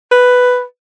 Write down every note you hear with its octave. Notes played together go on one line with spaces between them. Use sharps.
B4